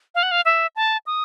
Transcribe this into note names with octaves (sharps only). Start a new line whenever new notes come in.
F5
F#5
F5
E5
A5
D#6